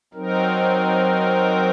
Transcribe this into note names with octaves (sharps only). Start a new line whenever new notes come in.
F#3 C4 D#4 A#4